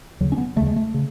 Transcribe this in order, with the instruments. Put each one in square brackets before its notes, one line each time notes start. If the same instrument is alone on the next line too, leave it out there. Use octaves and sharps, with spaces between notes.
[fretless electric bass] D#2 C#3 F#3
C#4
B3
D#2 C#3 A3
G#3
A3
C#3